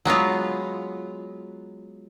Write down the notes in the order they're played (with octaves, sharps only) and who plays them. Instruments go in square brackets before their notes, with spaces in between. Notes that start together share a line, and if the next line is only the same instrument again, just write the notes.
[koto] F#3 G#3 B3 F4